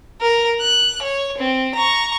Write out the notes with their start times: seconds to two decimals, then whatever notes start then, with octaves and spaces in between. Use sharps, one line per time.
0.21 A#4
0.60 F#6
1.02 C#5
1.38 C4
1.75 A#5 C#6